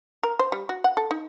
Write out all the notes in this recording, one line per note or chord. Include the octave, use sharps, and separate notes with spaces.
A#4
C5
G3
F#4
F#5
A4
D#4